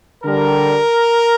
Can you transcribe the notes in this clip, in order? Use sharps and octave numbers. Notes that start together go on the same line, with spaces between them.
D3 G3 A#4